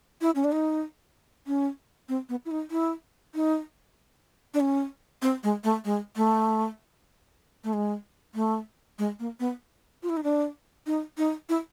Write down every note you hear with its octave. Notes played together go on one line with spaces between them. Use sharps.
E4
C#4
D4
D#4
C#4
C4
B3
E4
D#4
E4
D#4
D4
C#4
C4
G#3
A3
G#3
A3
A3
G#3
A3
G#3
A#3
B3
F4
E4
D#4
D4
D#4
D#4
E4